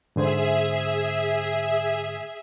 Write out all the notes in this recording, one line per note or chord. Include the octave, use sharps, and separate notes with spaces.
G#2 D3 G#4 C5 E5